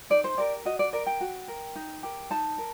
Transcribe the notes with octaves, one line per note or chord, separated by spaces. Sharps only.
D#4 D5
C5
G4 A#4 D5
F#4 D#5
D5
A#4 D5
G5
F#4
A#4
D#4
G4 A#4
D#4 A5
A#4